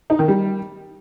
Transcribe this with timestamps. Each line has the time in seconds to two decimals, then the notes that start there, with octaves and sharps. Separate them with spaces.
0.10 D#4
0.19 D#3
0.28 G3